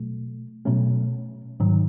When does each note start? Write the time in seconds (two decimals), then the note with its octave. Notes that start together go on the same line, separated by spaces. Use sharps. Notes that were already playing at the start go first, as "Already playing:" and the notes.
Already playing: B2 F#3 A3
0.65 B2 F#3 A3 C#4
1.60 G#2 D#3 F#3